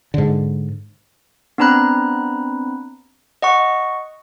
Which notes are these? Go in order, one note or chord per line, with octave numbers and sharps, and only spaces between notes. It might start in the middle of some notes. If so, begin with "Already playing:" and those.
G#2 D3
B3 C4 D4 A#5 B5 F#6
D#5 F#5 C#6